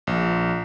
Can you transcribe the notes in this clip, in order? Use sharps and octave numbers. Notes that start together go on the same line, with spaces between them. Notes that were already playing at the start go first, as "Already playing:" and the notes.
A#1